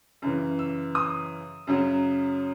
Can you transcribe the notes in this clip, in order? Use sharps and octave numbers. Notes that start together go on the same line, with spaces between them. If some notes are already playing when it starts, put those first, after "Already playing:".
F#2 C#3 E3
E6
D#6
F#2 C#3 F#3